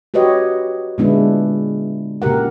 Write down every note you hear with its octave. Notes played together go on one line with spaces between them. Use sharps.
F#4 G4 B4 C#5 D#5
A#2 D3 G#3 B3 D4 E4
A#2 C#3 G4 A#4 F#5